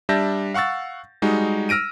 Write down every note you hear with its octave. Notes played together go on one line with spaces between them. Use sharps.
G3 D4 E5 A5 G6 A#6
F5 F#5 C#6 E6 A6
G3 G#3 D#4 F#4
E6 F6 A#6 D7 D#7